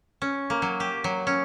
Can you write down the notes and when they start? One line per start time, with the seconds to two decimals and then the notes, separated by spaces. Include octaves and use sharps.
0.22 C#4
0.50 A#3
0.62 F#3
0.80 G4
1.04 F#3
1.27 C#4